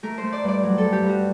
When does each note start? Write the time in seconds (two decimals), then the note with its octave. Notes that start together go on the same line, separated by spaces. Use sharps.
0.03 A3 A#4
0.18 C5
0.23 A3
0.33 D5
0.43 G2 D5
0.63 F#3
0.78 G2 A4
0.93 G4
1.03 G2 F#4